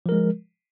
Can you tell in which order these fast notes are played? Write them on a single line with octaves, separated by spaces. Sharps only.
F3 A#4 G#3